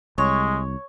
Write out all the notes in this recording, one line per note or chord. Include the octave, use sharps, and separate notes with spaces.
C2 G#3 C#5